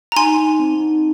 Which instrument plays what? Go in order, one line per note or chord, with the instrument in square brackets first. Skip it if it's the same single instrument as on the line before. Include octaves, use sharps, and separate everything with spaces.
[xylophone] A#5
[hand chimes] D#4 [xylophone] G#5 C6
[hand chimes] D#4
C4
D#4